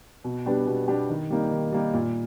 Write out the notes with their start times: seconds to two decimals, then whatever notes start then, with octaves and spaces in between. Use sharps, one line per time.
0.24 B2
0.46 G3 B3 D4 G4
0.67 B2
0.88 G3 B3 D4 G4
1.09 D#3
1.30 G3 A#3 D#4
1.51 D#3
1.72 G3 A#3 D#4
1.94 A#2